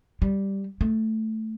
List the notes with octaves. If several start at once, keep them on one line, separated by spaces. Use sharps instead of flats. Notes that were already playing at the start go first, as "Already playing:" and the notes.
G3
A3